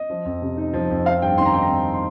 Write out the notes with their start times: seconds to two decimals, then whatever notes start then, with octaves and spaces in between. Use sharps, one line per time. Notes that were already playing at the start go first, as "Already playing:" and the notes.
Already playing: D#5
0.10 F3
0.25 F2
0.42 C3
0.57 D#4
0.74 F3
0.90 F2
1.05 C4 F5
1.22 G2 G5
1.38 D#3 C6
1.45 A#5
1.53 D#4 G5
1.63 A#5
1.70 C4
1.94 C6